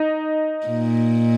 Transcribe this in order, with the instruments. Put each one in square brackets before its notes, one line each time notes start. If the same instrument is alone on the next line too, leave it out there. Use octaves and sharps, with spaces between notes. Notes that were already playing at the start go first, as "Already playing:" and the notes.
Already playing: [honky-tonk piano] D#4
[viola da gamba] A#2